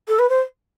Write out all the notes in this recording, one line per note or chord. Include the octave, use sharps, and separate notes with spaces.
A4
B4
C5